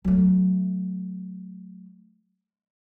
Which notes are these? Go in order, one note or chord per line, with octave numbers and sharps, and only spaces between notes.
F#3 A3